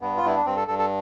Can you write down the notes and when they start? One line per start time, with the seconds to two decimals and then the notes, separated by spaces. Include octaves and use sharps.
0.01 G2 B3
0.17 F4
0.23 G2 E4
0.36 D4
0.46 G2 C4
0.57 A4
0.68 G2 A4
0.79 A4